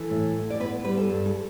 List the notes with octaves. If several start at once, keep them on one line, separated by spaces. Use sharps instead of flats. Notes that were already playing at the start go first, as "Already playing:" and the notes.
Already playing: E3 A4
A2
A2
D5
B3 B4
G3 B4
A4
G2
A4